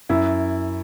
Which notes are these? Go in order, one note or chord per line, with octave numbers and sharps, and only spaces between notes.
F#2 E4